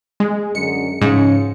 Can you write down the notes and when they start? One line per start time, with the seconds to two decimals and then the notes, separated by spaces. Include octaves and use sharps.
0.20 G#3
0.55 F#2 D3 G#3 C#7
1.02 G#2 C#3 F3 C#4